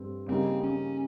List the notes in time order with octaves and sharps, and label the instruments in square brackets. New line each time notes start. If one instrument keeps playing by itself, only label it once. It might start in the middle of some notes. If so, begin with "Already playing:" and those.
Already playing: [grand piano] G2 G3 C4
[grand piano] C#3 G3 A#3 D#4 [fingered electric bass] C4
[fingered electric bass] C#4